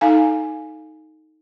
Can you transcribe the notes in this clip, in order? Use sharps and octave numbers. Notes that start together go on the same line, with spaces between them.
D#4 A4 F5 G#5